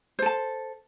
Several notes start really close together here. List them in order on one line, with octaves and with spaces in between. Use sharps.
C5 A4 A5